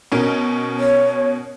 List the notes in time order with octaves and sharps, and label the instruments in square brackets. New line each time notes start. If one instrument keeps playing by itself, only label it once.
[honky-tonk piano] B2 C#4 A#4
[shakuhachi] C#5